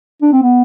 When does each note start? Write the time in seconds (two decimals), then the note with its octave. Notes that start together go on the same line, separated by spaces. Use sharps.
0.22 D4
0.33 C4
0.42 B3